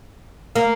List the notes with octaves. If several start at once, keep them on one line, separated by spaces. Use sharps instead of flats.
A#3